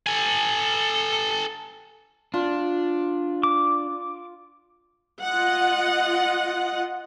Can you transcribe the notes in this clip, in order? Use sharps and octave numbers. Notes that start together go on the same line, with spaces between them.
A4 G#5
D4 F4
D6
F4 D#5 F#5